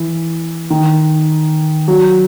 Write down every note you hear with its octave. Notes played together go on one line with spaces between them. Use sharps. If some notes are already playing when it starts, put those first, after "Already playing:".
Already playing: E3
D#3
F#3